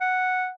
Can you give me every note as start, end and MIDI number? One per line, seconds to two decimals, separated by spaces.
0.01 0.50 78